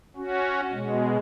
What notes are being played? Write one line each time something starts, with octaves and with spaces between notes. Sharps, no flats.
C#4 F#4
B2 G#3